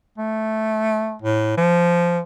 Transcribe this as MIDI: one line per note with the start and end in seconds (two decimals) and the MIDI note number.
0.18 1.16 57
1.22 1.54 45
1.57 2.20 53